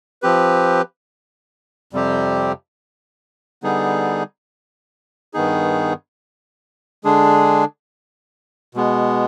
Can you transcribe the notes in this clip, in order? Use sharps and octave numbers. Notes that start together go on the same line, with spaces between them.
F3 C4 G4 B4
F2 C3 G3 C4 G4
D3 G3 B3 D#4 G#4
G2 D#3 B3 D#4 G#4
D3 G#3 D4 G#4
B2 G#3 B3